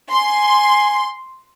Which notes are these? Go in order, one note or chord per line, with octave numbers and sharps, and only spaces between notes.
G#5 C6